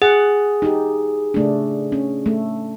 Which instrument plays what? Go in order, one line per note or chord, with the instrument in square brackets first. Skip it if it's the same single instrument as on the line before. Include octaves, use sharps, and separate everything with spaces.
[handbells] G#4 [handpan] F#5
[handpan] D#4 G4
C#3 A3 D4
C#4
A3